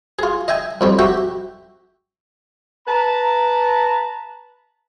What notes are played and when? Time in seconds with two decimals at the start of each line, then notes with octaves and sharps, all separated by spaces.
0.19 F4 G#4
0.48 D#5 E5 G5 G#5
0.81 F2 G3 C4
0.99 F#4 G4 E5 G5
2.87 B4 A5 A#5